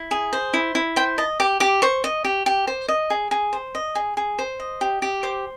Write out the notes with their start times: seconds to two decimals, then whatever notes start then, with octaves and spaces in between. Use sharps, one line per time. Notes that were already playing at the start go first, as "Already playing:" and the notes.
Already playing: E4
0.11 G#4
0.33 C5
0.54 E4
0.75 E4
0.96 C5 G5
1.18 D#5 A5
1.40 G4 D6
1.60 G4 D6
1.82 C5 C#6
2.04 D#5
2.25 G4
2.46 G4
2.67 C5
2.88 D#5
3.10 G#4
3.31 G#4
3.53 C5
3.75 D#5
3.95 G#4
4.17 G#4
4.39 C5
4.60 D#5
4.81 G4
5.02 G4
5.23 C5 D6